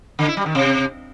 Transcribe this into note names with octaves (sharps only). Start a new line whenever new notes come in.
D3
E4
G3
D#3
C3